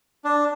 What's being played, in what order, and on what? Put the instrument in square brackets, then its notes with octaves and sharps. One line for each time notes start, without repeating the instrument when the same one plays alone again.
[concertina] D4